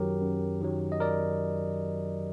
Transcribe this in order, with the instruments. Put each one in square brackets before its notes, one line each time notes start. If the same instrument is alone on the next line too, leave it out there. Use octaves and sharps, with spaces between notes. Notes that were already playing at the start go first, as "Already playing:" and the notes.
Already playing: [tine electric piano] F#2 D#3 F#3 G4 A#4
F#2
D#3 F#3
D#5
A#4 D5